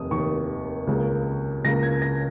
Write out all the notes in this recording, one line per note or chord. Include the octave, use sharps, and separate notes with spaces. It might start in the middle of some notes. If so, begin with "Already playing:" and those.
Already playing: F1 D#2 D#3 D#6
F1 D#2 D#3 C#6
C#2 C#3 A#3
C#2 C#3 A#3 A#6
G#6
A#6